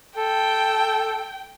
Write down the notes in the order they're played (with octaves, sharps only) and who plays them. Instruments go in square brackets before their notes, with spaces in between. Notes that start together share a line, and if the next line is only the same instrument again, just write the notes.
[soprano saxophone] A4 [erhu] G5